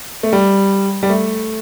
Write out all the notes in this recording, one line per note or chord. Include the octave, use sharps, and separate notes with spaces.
A3
G3
G3
A3